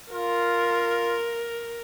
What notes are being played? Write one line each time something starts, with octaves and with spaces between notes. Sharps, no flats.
F4 A#4